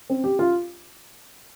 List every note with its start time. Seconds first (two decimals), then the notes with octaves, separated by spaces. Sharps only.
0.10 C4
0.24 G4
0.39 F4